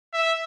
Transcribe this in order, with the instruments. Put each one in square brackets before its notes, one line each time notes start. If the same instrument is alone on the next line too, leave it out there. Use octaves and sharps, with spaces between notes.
[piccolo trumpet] E5